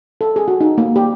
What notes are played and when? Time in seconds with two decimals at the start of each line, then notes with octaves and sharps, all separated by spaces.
0.21 A4
0.36 G#4
0.48 F#4
0.61 D#4
0.78 A#3
0.96 G4